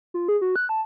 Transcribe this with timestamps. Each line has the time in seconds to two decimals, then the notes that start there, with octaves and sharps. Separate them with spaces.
0.14 F4
0.28 G#4
0.41 F#4
0.56 F#6
0.69 A5